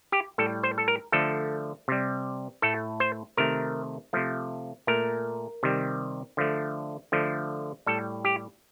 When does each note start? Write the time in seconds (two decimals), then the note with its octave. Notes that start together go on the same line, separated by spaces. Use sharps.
0.12 G4
0.38 A2 G3 A4
0.63 C5
0.78 A4
0.88 A#4
1.12 D3 F3 A3 A4
1.88 C3 G3
2.62 A2 A3 A4
3.00 C5
3.37 C3 D#3 A3 A#4
4.13 C3 F3 A3
4.87 A#2 A3 A#4
5.63 C3 D#3 G3
6.37 D3 F3 A3
7.12 D3 F3 A3
7.86 A2 G3 A4
8.25 G4